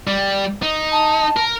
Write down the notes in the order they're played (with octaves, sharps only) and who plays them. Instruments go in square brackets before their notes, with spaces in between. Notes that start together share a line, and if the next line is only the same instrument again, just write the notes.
[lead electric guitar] G3
D#4
[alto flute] A5
[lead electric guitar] A#4